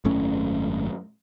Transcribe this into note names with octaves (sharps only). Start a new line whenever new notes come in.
G#1 F#2 A3 C#4